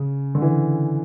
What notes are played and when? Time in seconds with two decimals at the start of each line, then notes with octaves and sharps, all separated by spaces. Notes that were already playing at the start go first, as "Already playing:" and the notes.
Already playing: C#3
0.35 D3
0.42 E3